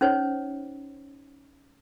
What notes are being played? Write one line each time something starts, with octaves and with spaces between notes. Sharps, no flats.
C#4 D#4 C5 C#5